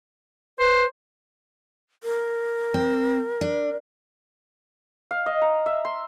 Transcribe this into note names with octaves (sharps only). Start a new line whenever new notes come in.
B4 C5
A#4
C4
D4
F5
D#5
A#5
E5
C6